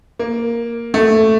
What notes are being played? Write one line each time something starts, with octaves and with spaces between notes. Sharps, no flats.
A#3
A3